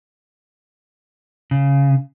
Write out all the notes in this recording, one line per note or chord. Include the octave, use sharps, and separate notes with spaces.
C#3